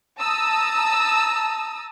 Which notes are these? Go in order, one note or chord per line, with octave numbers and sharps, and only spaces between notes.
A5 A#5 D#6 E6